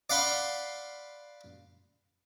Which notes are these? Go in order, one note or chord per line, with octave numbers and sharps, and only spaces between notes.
D5 F5 F#5 B5 C6